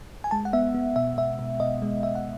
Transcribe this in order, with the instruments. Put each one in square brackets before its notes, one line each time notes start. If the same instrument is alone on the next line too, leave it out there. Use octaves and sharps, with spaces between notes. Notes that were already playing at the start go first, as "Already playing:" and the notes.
[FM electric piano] G#5
G#3 A5
F#5
B3 E5
B3
B2 E5
B2 E5
B2
B2 D#5
G#3
G#3 E5
F#5